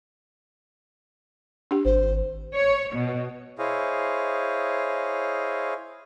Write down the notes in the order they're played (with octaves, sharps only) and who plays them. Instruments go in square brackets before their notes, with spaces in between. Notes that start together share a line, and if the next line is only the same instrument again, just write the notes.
[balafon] D4 G4
[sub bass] G#1 [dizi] C5
[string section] C#5
B2
[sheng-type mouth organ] E4 G#4 C5 C#5 D#5 F5